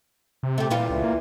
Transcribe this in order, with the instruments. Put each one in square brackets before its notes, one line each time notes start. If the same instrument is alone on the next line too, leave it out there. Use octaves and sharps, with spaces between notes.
[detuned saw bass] C3
[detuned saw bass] C3 [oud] A3 G4
[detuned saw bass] A#2 [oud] E3 G3 F4
[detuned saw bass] C#2
A#3